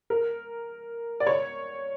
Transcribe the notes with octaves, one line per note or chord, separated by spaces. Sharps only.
A#4
D5
C#5